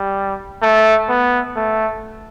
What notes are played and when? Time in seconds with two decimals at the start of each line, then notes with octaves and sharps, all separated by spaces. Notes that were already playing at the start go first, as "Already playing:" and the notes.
Already playing: G3
0.62 A3
1.09 B3
1.56 A3